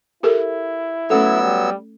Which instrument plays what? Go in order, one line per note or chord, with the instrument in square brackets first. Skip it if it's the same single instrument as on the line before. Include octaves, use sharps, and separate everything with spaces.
[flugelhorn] E4 [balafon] G4 A4 A#4
[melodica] F#3 B3 E6 [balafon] A3 C#4 A4
[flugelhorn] G3